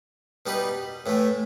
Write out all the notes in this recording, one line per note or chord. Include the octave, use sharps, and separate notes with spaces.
B2 G3 D#4 G4 B4
A2 E3 A3